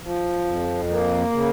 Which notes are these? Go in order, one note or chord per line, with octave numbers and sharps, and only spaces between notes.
F3
F2
A#3
C#3